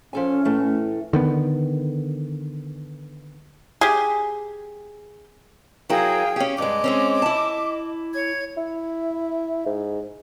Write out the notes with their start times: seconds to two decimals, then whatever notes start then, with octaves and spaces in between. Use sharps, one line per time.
0.13 F3 C#4 A4 G#5
0.45 A2 E3 A3
1.13 D3 D#3 B3
3.81 G4 G#4
5.90 F#3 E4 G#4 A#4 F5 G5
6.36 C#4 G4
6.58 G2 G#3 D#5 D6
6.84 G#3 C4 C#4
7.22 E4 A5
8.13 C#5 G#6
8.57 E4
9.66 G#2